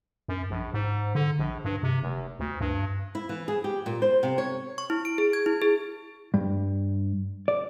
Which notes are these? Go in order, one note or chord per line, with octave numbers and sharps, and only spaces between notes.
F#2
A#1
G#2
D3
A#1
G2
C3
F1
D2
G2
E4
E3
G#4
G4
A#2
C5
C3
C#5
C#6
E4
D7
G#4
G#6
E4
G#4
G2
D5